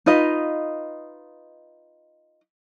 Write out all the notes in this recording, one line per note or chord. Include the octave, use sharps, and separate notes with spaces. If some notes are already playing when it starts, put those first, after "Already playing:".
D#4 F4 B4 D#5